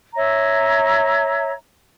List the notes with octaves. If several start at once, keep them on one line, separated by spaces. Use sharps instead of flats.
C#5 E5 A#5